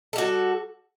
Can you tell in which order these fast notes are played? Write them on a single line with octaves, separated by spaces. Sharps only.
A4 G3 F#4